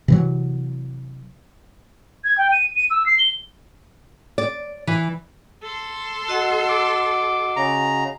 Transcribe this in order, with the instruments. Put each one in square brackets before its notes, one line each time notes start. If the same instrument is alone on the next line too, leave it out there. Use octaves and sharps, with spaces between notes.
[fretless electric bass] C3 E3 F#3
[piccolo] G#6
G5
D#7
D#7
E6
C7
G7
[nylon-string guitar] D5
E3
[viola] A4 C6
[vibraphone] F#4 D#5 F#5
[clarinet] D6
[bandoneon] C#3 A#5